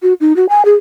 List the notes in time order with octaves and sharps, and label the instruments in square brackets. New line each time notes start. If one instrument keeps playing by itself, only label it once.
[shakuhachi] F#4
D#4
F#4
G#5
G#4